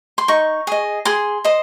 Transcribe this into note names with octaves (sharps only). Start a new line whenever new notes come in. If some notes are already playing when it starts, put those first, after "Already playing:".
C6
D#4 C#6
G#4 D#5
G#4 C6
C5 D#5